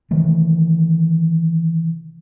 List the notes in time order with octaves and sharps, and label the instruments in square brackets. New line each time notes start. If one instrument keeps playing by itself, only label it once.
[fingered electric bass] C3 D#3 E3 A3